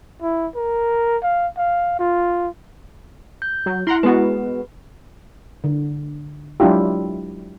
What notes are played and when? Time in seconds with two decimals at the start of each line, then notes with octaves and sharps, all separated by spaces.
0.22 E4
0.55 A#4
1.23 F5
1.57 F5
1.99 F4
3.42 G6
3.66 F#3
3.87 E4 F#5 A#5 C6
4.03 G#3 B3 F#4 B4
5.64 D3
6.60 F#3 G#3 D4 E4 F4 G4